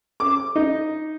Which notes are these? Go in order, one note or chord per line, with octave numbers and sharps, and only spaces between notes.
D6
D#4